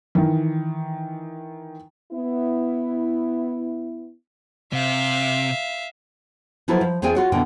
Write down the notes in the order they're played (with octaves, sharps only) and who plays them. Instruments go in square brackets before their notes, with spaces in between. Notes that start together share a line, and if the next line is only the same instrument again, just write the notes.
[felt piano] D#3 E3
[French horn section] B3 E4
[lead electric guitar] C3 [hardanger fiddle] E5 F5
[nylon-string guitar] F3 F#3 E4 F4 A4 B4
F3
E2 C4 F4 G#4 G5 G#5
F4 F#4 C#5
E2 B2 D3 E3 G5